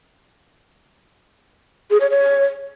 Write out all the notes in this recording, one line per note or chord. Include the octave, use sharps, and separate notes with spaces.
G#4
C#5
C#5